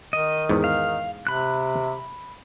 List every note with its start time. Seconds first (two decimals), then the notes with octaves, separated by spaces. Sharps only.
0.13 D#3 D#5
0.49 E2 G#2
0.64 F5
1.27 C3 B5 F#6